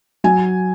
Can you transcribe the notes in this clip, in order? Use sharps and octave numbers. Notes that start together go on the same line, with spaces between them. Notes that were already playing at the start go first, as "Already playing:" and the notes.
F#3 G#5